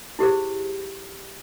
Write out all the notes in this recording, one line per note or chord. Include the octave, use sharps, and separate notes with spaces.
E4 G4 G#4 C5